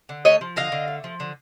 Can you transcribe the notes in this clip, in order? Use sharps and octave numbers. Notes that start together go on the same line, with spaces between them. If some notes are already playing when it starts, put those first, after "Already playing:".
D3
A3 C#5 D#5
F3
D3 D#5 F5
D3
A3
F3
D3